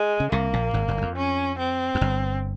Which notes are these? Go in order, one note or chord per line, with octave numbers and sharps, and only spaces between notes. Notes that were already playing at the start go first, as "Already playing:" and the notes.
Already playing: G#3
C#3
C2 C3 A#3
A#1 A#2
G#1 G#2
G1 G2
E2
F2
C#4
C4
F2
G1 G2